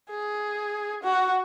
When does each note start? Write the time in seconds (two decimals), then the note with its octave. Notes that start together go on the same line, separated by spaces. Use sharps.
0.10 G#4
1.03 F#4